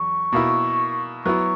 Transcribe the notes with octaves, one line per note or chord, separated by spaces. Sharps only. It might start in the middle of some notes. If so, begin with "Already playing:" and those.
Already playing: E2 F#3 C#6
B2 A#3 E4
F#3 B3 E4 C#6